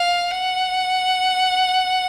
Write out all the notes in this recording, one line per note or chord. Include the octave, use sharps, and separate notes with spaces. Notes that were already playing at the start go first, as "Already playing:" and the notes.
Already playing: F5
F#5